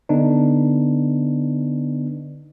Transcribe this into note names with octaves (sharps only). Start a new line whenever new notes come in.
D3 B3 D4 D#4